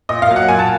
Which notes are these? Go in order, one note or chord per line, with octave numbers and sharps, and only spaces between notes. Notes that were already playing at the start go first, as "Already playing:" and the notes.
A#2 D#5
F5
F#3 A#3
F#5
A#2 G#5
A5